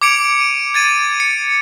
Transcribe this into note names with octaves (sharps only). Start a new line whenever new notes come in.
D6 G#6 C#7 D7 F7
D#7
G#6 A6 D#7
C#7